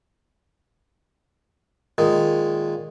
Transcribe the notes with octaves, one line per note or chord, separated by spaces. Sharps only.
A#2 D#3 G#3